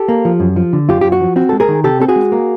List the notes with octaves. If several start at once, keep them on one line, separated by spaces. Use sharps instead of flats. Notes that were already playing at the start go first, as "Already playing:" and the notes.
Already playing: G4 A4
A#3
F3
F#2
F3
D3
F#2 F4 G4
F#2 G4
F#4
F3
C4 F#4
G#3 A4
G#4 A#4
D#3
C3 G4 A4
C4 A4
F#4 G#4
G#3
A#3